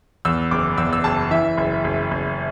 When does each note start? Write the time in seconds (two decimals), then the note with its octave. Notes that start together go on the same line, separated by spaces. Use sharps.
0.25 E2 E6
0.51 F#1 D6
0.77 E2 E6
0.93 E6
1.04 F#1 A5
1.31 E3 E5
1.57 F#1
1.84 F#1
2.11 F#1